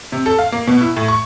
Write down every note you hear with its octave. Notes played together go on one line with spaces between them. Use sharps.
C3
A4
F5
A#3
B2
E4
A2
C#6